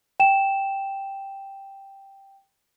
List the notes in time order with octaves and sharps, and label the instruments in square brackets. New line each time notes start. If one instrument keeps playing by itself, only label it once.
[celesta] G5 E7